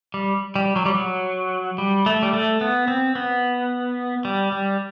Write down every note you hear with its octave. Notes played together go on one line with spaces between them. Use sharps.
G3
G3
F#3
G3
F#3
G3
A3
G3
A3
B3
C4
B3
G3
G3